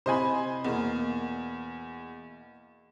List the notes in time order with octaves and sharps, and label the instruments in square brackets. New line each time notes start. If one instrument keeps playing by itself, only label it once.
[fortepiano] C3 E4 B5 [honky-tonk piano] C5 D#5 G#5
[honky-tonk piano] E2 [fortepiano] B2 A#3